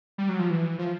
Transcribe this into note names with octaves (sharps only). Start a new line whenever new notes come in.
G3
F#3
F3
E3
F3